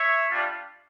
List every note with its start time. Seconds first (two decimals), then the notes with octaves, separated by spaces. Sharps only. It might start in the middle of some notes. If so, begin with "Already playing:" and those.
Already playing: C#5 E5
0.29 G3 D4 F4